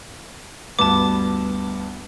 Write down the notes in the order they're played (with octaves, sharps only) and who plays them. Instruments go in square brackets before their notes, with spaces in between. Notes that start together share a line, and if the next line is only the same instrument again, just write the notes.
[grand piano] D2 G2 B3 [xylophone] A5 D6